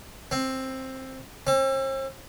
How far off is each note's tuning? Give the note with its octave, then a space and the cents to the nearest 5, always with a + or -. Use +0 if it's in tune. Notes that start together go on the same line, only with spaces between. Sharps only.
C4 +10
C4 +45